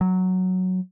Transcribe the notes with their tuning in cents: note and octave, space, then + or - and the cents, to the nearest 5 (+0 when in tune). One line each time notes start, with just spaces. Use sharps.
F#3 +0